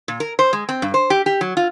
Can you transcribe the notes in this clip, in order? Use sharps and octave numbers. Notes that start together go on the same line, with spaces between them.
A#2
A#4
C5
G#3
C4
G2
C5
G4
G4
F#3
F4